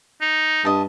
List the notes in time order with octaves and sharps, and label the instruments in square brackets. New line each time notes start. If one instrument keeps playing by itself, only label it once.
[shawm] D#4
[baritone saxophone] G2 [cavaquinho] D#5 A5